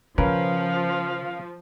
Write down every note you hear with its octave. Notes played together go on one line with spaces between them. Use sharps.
C#3 F3 C#4 A#4 B4 F5